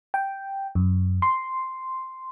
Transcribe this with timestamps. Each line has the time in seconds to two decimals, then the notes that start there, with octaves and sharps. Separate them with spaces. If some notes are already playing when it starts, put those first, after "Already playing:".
0.14 G5
0.75 F#2
1.22 C6